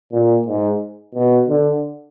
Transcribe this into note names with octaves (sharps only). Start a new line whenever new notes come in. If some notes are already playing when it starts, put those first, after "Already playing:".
A#2
G#2
B2
D3